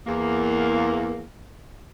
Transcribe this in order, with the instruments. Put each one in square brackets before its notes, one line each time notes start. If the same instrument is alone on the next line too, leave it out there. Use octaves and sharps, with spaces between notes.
[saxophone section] E2 A#3